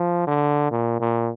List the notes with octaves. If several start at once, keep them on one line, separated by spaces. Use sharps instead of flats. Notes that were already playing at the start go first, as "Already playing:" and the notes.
Already playing: F3
D3
A#2
A#2